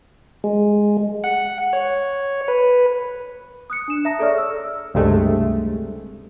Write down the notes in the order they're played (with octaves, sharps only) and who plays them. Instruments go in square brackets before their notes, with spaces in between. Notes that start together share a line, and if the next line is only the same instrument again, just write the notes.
[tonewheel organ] G#3
F#5
C#5
B4
[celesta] D#6 F#6 C#7
D4 E7
E5 A5 A#5 D#6 A#6
G#4 A4 C#5 D5 C#6 F6
E6
[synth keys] C#2 G2 C3 G#3 A3